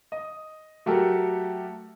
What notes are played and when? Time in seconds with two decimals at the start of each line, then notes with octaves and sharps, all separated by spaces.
0.12 D#5
0.86 F#3 A3 F#4 G4 A4 A#4